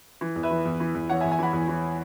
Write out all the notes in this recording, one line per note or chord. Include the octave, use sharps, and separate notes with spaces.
E3
E2
B4 E5
E3
E2
E3
E2
E3 C#5 F#5
E5 G#5
E2
E5 G#5
E3 F#5 B5
E2
E3